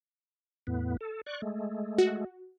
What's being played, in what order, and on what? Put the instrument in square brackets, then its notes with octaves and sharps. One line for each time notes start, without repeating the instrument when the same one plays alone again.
[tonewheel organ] E2 A2 B3
A4
D5 C#6 F#6
G#3 A3
[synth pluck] F#4